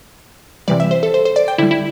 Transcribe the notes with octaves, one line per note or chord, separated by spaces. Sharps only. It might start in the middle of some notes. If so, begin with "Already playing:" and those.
C3 E3 G3 D5
E5
C5
A4
C5
C5
D5
G5
D3 G3 E4
E4